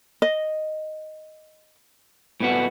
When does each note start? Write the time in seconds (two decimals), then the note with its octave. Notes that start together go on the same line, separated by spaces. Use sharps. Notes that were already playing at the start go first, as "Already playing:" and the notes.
0.22 D#5
2.40 A2 B3 F#4